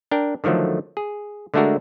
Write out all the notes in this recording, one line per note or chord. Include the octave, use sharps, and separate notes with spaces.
D4 A#4 G5
D3 D#3 F3 F#3 A3
G#4
D3 G#3 A3 D4 F#4 A#4